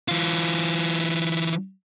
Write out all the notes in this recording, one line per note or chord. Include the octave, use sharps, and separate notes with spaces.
E3 F4